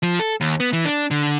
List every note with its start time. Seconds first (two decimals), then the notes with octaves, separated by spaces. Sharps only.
0.03 F3
0.19 A4
0.41 D#2
0.60 B3
0.73 E3
0.85 D4
1.11 D3